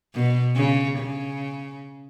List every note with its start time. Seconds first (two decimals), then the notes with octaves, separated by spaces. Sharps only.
0.14 B2
0.55 C#3
0.97 C#3